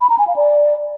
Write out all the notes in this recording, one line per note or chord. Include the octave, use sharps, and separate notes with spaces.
B5
A#5
G#5
F5
D5